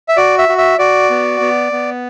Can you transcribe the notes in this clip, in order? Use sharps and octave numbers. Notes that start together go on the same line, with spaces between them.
E5
F#4 D5
E5
F#4
E5
F#4 D5
B3
B3
B3